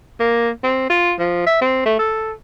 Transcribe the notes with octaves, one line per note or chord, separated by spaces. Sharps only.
A#3
C4
F4
F3
E5
C4
A3
A4